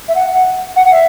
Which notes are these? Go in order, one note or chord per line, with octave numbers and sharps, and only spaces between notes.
E5
F#5
F#5
E5